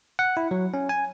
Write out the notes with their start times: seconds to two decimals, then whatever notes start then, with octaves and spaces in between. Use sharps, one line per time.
0.19 F#5
0.37 E4
0.51 F#3
0.74 C#4
0.89 G#5